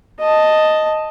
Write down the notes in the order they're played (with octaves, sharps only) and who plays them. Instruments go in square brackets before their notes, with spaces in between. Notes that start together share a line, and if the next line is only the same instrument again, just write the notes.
[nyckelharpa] D#5 A5